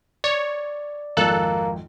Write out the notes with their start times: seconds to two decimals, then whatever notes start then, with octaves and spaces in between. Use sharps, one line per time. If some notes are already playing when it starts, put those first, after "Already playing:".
0.24 C#5 D5
1.17 G#1 F2 A#3 A4 F#6